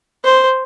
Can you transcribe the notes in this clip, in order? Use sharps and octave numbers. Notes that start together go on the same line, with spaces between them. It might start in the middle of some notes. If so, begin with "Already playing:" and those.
C5